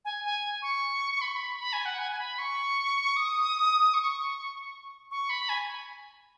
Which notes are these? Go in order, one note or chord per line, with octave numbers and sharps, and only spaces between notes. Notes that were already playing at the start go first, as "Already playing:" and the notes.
G#5
G#5
C#6
B5
C#6
B5
B5
G#5
F#5
G#5
G#5
B5
C#6
D#6
C#6
C#6
B5
G#5